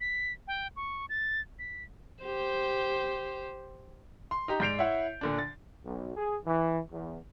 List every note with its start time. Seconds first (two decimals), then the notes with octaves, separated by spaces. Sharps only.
0.01 B6
0.48 G5
0.76 C#6
1.09 A6
1.59 B6
2.23 G4 C5
4.31 C6
4.48 D#4 G4 A#5
4.60 G#2 D5 G6 C7 D7 F7
4.79 E4 C#5 E5 F#5
5.21 A#2 D3 D4
5.39 A6
5.85 B1
6.17 G#4
6.45 E3
6.91 E2